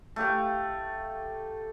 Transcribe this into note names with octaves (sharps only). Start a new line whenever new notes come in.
A3 G4 F5